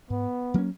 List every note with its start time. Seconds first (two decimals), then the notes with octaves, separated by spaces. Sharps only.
0.10 G#2 B3
0.54 F#3 A#3 C#4